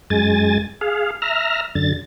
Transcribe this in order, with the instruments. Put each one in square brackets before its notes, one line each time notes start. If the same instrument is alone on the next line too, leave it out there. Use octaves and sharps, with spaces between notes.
[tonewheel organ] F#2 G#3 G#5 A6
G#4 F5
E5 A#5 F6
F#2 D3 A6